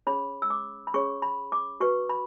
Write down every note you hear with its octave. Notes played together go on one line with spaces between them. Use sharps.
C#4 G#4 C#5 B5
E6
D6
B5
C#4 G#4 C#5 C#6
B5
D6
F#4 B4 C#6
B5